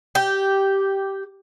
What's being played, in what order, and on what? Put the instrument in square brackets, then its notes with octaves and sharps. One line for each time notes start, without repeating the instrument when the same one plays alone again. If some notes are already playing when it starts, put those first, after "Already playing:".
[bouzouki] G4